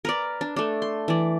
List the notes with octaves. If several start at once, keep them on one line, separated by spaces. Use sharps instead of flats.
A#4 B4 D5
D4
A3 D4
C6
E3 D5